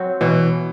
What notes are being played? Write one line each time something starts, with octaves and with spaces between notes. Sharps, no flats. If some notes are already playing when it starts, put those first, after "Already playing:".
Already playing: F#3 C4 F#4
B2 E3